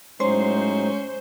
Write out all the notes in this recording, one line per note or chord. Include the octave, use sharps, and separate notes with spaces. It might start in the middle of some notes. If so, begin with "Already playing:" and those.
A2 F#3 G#3 C#4 D#4 C5